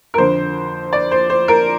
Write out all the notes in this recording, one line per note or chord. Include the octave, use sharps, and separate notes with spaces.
A#4
F2 D3 C5
D5
C5
C5
A#4